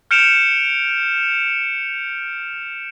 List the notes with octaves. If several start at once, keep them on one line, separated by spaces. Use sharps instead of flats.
F6 G6 C#7 D7 E7 F7